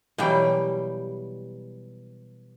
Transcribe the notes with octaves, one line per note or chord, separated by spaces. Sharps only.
B2 E3 F#3 G3 G5